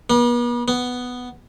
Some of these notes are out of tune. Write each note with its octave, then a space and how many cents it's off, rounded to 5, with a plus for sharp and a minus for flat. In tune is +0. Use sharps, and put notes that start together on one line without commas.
B3 -40
B3 +5